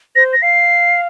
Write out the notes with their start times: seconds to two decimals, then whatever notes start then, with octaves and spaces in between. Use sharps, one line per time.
0.16 C5 A#6
0.33 A#6
0.42 F5 C7